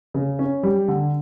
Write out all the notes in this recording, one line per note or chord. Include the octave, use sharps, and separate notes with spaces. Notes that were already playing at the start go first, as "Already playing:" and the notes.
C#3
C#4
G3
D3